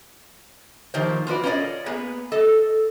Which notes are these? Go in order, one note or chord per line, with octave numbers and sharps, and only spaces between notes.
D#3 F3 A#3 G4 C5
F4 F#4 B4 D5
C#4 F4 A4 A#4 D5 D#5
A#3 B3 G#4 B4
A4 D#5